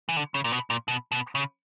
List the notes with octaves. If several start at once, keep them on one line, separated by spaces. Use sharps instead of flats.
E3
D3
C#3
A#2
B2
A#2
B2
B2
C#3